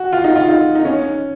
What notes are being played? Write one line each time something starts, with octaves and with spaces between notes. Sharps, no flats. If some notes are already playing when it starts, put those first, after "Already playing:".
Already playing: F#4
F4
D#4
F4
D#4
D#4
C#4